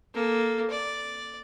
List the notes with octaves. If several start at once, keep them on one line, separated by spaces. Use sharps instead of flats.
A#3 A4
D5